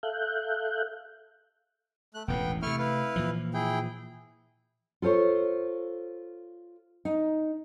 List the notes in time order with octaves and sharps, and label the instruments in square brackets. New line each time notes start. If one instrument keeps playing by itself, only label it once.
[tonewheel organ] A4 E5 F5 F#6 G6
[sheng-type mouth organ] A3 F#6
[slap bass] E1 A1 A2 [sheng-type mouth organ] B3 G5
[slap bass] C3 A3 [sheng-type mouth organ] E4 C#6 F6
[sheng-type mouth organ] E4 B4 F5
[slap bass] A#2 E3 F3
[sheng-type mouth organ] E4 G#4 G5
[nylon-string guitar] F4 A4 C5 C#5
D#4